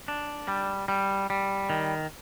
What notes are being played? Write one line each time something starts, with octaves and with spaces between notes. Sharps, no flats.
D4
G3
G3
G3
D#3